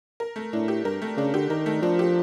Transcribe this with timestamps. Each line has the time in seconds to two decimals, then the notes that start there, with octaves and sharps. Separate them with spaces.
0.20 A#4
0.36 A3
0.53 A2 D4
0.68 G4
0.85 G2 A#4
1.02 A3
1.17 C#3 D4
1.34 D3 G4
1.49 D#3 A#4
1.66 A3
1.82 F3 D4
1.99 G4